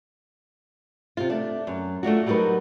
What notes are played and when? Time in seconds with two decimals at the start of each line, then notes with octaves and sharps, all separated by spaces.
1.17 C3 F4
1.30 A3 D4
1.67 F#2
2.03 A3 D4 F4 F#4
2.26 F#3 G3 D#4 F#4 A#4 B4